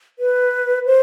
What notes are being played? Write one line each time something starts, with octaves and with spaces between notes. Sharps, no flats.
B4
C5